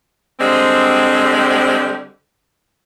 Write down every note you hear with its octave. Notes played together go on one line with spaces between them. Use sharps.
D3 G3 G#3 C4